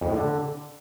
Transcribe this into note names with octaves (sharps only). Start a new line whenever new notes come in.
F2
A2
D3